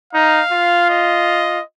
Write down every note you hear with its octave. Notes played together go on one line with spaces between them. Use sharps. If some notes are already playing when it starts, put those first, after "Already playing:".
D#4 F5
F4
D#5